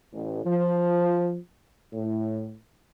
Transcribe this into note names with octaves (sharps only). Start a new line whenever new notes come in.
A1
F3
A2